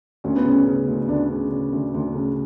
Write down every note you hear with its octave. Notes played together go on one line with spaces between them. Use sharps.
D2 C#4
B3
C#3 C#4
C#3
D2
D2 D4
C#3
C#3
D2
D2
C#3